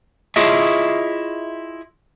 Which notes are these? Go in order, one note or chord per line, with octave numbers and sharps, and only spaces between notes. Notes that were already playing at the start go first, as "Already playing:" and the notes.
E4 F4 G#4 C#5 D#5 E5